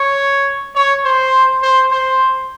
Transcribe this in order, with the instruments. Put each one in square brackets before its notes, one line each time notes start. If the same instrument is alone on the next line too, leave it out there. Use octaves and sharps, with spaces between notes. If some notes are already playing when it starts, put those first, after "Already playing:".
Already playing: [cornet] C#5
C#5
C5
C5
C5